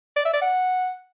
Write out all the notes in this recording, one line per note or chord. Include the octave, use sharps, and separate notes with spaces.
D5
E5
D5
F#5